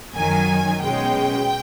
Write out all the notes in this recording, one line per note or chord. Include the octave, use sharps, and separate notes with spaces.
F#2 D#3 F#3 G#5
B2 G#3 C#4 G5